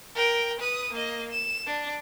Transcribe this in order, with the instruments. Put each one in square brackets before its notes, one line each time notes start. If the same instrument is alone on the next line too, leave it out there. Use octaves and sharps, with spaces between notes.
[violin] A#4 G5
B4 D#6
A#3 D#5
E7
D4